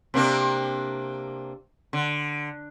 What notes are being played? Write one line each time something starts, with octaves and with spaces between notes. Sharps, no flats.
C3 A#3 D4
D3